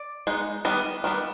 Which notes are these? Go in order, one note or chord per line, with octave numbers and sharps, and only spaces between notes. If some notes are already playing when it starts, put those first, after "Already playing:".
Already playing: D5
G#3 B3 D#4
D#3 G3 B3 D#5
D#3 G3 B3